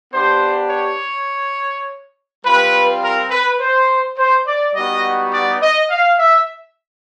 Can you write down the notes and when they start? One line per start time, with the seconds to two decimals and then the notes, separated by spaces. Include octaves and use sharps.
0.13 B3 D4 G4 C5
0.71 C#5
2.43 G3 C4 F4 B4
3.01 A#4
3.30 B4
3.59 C5
4.17 C5
4.46 D5
4.75 G3 B3 D#4 F#4 D#5
5.33 D5
5.61 D#5
5.90 F5
6.19 E5